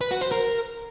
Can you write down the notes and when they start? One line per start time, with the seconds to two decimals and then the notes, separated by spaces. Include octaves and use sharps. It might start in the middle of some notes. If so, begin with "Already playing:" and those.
0.01 B4
0.11 F#4
0.21 C5
0.32 A#4